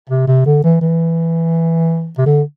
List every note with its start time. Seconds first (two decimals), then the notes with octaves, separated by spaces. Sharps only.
0.09 C3
0.27 C3
0.46 D3
0.64 E3
0.81 E3
2.18 C3
2.26 D3